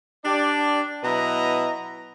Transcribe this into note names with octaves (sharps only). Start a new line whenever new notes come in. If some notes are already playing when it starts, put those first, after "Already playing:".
D4 G4 D5
B2 F#3 E4 B4 D#5 A#5